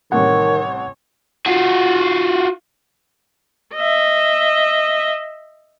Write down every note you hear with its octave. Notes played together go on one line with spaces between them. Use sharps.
A1 C3 D#3 G3 C#5 F#5
F4 F#4
D#5 E5